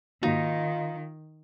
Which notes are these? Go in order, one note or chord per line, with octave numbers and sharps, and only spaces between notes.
G#2 D#3 A#3 D#4 F4 F#4